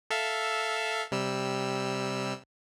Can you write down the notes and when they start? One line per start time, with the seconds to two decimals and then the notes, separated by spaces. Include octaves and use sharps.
0.10 A4 E5 F5
1.12 C3 G3 E6